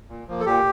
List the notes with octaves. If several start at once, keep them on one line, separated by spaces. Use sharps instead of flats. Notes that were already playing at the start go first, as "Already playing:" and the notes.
A#2
F3 A#3
A4
A#2 G4